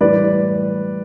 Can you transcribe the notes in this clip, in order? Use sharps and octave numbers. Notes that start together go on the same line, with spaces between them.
A2 E3 G3 B4 D5